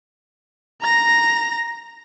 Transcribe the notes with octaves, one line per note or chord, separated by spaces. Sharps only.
A#5 A#6